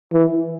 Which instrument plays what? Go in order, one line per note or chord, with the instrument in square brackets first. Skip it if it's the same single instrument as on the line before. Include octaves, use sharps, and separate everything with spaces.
[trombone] E3